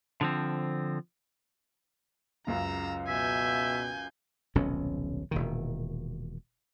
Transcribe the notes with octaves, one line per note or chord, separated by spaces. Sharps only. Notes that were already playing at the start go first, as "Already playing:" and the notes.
D3 F3 C4
C#2 F#2 C#3 A#5 E6
B2 E5 G#5 G6
D#1 B1 C3 C#4
E1 A#2 D#3